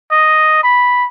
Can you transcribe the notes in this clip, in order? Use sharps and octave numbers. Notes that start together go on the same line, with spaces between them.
D#5
B5